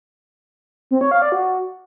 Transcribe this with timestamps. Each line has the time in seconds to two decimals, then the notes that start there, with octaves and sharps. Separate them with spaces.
0.91 C4
1.01 C#5
1.11 F5
1.22 D5
1.32 F#4